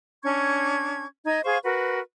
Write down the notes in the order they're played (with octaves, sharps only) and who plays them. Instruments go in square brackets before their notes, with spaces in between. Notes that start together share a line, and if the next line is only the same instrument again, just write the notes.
[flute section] C#4 D4 C#6 G#6
D#4 D#5 G#6
G#4 C5 F5 C#6
F#4 A#4 B4